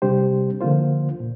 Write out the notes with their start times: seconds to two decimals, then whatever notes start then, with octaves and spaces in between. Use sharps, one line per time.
0.02 C3 G3 D4 G4 C5
0.61 D3 F3 A#3 F4 C5
1.20 A#2